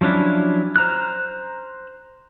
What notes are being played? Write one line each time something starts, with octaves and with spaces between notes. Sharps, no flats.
F3 F#3 C#4 D4 E4
C5 A#5 F6 F#6